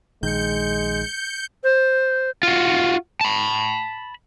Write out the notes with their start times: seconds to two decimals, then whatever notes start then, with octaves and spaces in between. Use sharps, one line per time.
0.23 A#1 D#3 G#3 G6 C#7
1.63 C5
2.43 F4 F#4
3.21 A5 B5